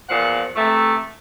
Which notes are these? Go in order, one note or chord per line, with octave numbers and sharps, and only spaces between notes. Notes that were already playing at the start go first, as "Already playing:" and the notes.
E2 A#2 F3 F#5
C3 E3 A3